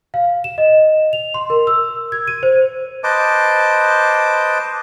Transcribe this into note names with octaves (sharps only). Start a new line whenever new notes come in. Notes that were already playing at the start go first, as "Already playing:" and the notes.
F5
E7
D#5
F7
C6
A#4
E6
G#6
D#7
C5
B4 C5 D#5 A5 D6